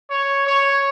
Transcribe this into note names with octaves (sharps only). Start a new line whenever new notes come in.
C#5
C#5